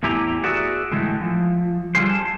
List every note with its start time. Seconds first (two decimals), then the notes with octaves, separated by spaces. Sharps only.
0.03 E2 A2 E4 G4 G#5 A#5
0.44 F#4 G#4 B4 D5 E5 F#5
0.92 A2 D3 E3 G#3 A3
1.21 F3
1.95 D3 G3 F4 G#4 C5
2.09 A5